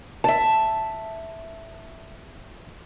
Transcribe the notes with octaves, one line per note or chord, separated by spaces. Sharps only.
E5 A5